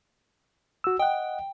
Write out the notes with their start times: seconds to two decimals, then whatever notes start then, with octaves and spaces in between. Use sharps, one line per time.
0.84 F#4 E6
0.99 D#5 F#5 G5